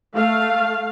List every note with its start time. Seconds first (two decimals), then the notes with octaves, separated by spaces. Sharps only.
0.14 A3 F5